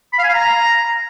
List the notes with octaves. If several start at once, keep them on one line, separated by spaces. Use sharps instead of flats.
B5
F5
G#5
F5
A#5